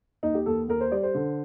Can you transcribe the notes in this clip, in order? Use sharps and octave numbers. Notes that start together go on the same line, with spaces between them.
D#2 D#4
G4
D#2 A4
D#2 A#4
C5
G3 D5
C5
D3